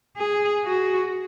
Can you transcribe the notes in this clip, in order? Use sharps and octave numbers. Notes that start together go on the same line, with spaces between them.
G#4
F#4